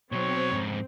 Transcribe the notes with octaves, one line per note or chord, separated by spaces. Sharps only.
B2 F#3 C4 C#5
F2 G#2